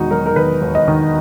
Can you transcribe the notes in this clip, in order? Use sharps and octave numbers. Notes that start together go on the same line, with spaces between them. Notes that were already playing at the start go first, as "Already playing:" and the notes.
Already playing: E1 D#3 D#4 F#4
F#3 A#4
A#4
D#3 B4
D#2
D#5
D#3